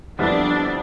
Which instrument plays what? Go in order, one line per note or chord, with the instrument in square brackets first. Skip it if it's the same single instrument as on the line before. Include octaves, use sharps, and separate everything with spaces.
[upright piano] F2 D3 G3 B3 E4 [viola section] D4